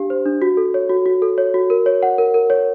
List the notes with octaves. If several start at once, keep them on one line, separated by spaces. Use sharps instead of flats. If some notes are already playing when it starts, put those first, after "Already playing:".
Already playing: D4 G4 F5
C5
D4
F#4
A4
C#5
F#4
F#4
A4
C#5
F#4
A#4
C#5
F#5
A#4
A#4
C#5